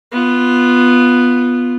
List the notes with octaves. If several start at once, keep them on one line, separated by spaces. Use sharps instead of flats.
B3 F4